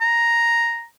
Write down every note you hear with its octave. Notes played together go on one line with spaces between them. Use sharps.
A#5